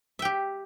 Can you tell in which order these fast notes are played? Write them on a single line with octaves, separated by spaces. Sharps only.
E5 G5 G4